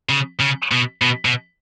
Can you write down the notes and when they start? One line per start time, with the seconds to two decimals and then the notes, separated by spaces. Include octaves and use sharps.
0.09 C#3
0.40 C#3
0.71 B2
1.02 B2
1.25 B2